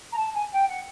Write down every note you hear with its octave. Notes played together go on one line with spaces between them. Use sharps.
A#5
A5
G#5
G5
F#5